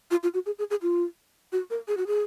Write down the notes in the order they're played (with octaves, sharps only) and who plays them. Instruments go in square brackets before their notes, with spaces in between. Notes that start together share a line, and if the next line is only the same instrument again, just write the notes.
[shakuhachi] F4
F4
F#4
G#4
G#4
G#4
F4
F#4
A#4
G#4
F#4
G#4